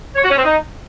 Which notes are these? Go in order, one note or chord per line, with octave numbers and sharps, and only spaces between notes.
C#5
F#4
C#4
C4
D#4